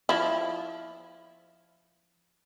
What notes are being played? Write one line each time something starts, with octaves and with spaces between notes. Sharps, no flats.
F3 E4